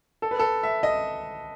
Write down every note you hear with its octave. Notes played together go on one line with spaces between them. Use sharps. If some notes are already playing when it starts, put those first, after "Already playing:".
A4
B4
A4
E5
D#5